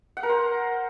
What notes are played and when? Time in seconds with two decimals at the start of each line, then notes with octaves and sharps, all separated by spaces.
0.17 F#5
0.23 A#4
0.29 C5